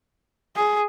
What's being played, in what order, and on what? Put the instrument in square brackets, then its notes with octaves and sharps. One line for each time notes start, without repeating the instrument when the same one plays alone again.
[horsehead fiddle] G#4